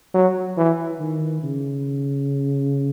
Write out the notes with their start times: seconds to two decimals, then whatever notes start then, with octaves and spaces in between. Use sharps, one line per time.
0.14 F#3
0.57 E3
1.00 D#3
1.43 C#3